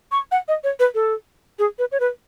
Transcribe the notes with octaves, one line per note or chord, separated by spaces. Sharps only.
C#6
F#5
D#5
C#5
B4
A4
G#4
B4
C#5
B4